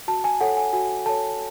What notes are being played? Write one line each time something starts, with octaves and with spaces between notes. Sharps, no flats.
F#4 A5
G#5
A4 C#5 F#5
G#5
F#4 G#5
A4 C#5 A5